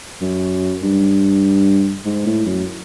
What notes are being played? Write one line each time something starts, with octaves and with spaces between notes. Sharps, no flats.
F#2
G2
G#2
A2
F#2